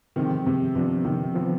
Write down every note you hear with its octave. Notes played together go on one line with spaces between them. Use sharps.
G#2 C3 D#3 F3 G#3 C4 G4
C3
C3 F3 B3 D4
C3 D#3
D3 F3 B3